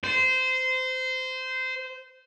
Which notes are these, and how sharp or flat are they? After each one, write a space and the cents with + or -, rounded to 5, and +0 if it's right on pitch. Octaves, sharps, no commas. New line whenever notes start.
C5 -20